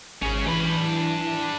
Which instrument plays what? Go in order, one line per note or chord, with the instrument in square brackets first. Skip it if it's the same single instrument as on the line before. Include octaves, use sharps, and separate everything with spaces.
[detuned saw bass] G#1 [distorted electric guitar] C#4 G#4
[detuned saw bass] E3 [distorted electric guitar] D4 B5